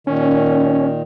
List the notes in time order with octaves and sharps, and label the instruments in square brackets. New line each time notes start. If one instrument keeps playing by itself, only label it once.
[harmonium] A#2 D#3 [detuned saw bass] C#4